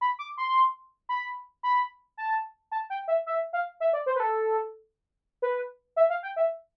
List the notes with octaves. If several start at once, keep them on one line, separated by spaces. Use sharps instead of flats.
B5
D6
C6
B5
B5
A5
A5
G5
E5
E5
F5
E5
D5
C5
B4
A4
B4
E5
F5
G5
E5